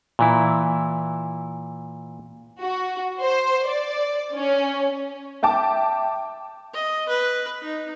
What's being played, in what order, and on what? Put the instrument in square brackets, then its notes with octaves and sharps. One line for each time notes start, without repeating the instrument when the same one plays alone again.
[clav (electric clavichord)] A#2 E3 E4
[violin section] F#4
C5
D5
C#4
[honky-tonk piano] E5 G5 A5 D6
[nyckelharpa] D#5
B4
D#4